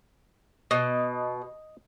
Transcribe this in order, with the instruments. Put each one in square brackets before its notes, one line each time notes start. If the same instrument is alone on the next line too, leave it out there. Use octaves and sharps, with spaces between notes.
[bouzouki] B2 [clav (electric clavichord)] D#5